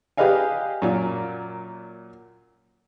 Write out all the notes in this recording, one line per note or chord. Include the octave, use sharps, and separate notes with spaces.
G4 G#4 B4 D#5 F5 G#5
F#2 A#2